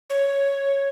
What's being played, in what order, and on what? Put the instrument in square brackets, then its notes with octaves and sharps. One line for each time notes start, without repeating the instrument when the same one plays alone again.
[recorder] C#5